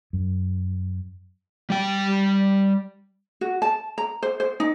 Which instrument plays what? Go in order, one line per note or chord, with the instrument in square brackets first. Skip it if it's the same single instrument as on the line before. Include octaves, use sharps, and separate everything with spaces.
[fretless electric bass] F#2
[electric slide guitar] G3 G5
[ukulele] F#4
A5
A#5
C5
C5
D#4